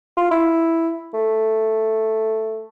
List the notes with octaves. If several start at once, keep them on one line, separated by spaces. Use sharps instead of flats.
F4
E4
A3